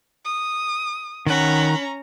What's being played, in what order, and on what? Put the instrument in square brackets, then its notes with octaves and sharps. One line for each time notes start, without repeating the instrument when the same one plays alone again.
[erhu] D#6
[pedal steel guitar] D#3 F#5 [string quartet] C#4 A#5 [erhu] B5